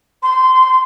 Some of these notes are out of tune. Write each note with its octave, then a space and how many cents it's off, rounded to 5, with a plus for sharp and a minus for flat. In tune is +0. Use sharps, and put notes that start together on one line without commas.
C6 -20